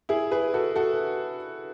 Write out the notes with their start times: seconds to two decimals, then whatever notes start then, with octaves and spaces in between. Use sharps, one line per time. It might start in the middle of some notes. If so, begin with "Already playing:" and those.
0.09 E4 G#4
0.31 G#4 B4
0.54 F#4 A4
0.76 F#4 A4